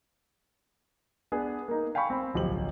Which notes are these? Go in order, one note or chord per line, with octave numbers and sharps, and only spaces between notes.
B3 D4 G#4
A#3 D#4
F5 G5 G#5 B5 C#6
C4 B5
D1 B1 F3 G4 C5 F#7